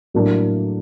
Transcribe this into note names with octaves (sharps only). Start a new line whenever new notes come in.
A2 F#3 A#3 D4